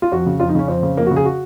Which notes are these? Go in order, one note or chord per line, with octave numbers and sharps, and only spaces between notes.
F4
F2 F#4
C#3
F2 F4
D#4
C#3 C#4
F2 C4
C#3
F2 A#3
F#4
C#3
G#4
F#4